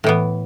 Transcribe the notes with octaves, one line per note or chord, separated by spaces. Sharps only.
A2 E3 B3